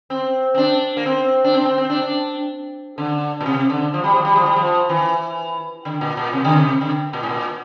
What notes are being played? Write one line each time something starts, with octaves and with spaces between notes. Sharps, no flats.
C4
C4
D4
A#3
C4
D4
C4
C4
C4
D4
D4
D3
A#2
C3
D3
F3
G3
F3
G3
F3
G3
F3
E3
D3
A#2
A#2
C3
D3
C3
D3
A#2
A2
A#2